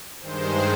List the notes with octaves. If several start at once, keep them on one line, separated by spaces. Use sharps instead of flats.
G2 D#3 G#3 C5